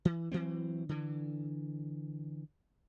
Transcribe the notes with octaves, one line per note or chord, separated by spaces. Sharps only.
E3
E3 F#3 C4
D3 E3